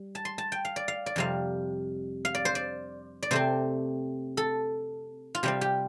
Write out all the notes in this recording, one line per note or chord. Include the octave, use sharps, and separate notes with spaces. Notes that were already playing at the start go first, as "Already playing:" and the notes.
Already playing: G3
A5
C6
A5
G5
F5
D5
F5
D5
F2 C3 G3 F5
F5
D5
C5
D5
D5
C3 A3 C4 C5
A4
F4
C3 G3 C4 G4
G4